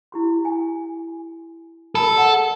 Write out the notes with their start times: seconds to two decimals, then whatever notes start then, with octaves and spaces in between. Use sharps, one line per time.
0.12 E4 G4 C6
0.45 G#5
1.95 A4 A#4 A5 B5
2.15 D5 F#5